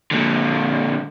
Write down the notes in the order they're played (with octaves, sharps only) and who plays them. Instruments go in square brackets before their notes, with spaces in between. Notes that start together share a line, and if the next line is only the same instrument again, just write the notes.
[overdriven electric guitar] A#2 D3